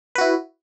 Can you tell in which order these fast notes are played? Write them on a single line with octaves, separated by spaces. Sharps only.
B4 F#4 E4